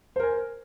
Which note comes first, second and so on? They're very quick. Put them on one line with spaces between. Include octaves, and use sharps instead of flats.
C5 A#4 G#5